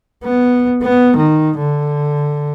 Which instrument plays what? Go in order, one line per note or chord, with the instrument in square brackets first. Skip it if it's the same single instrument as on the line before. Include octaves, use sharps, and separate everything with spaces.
[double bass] B3
B3
D#3
D3